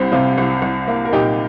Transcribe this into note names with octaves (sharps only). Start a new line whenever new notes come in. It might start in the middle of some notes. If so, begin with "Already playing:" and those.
Already playing: C2 G3 C4
C3 C4 F4
C2
C2
A#3
A#4
A#2 D#4 G4